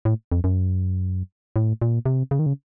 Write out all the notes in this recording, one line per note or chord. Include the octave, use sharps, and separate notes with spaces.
A2
F2
F#2
A2
A#2
C3
C#3
D#3
C#3